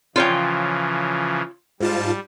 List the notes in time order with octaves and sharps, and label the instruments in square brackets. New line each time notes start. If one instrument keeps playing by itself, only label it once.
[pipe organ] C#3 E3 F3 [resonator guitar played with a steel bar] F4 C#5 G5
[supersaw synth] G#2 F4 A5 [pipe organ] G3